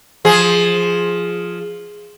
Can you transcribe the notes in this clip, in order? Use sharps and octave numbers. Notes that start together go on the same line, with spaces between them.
F3 G#4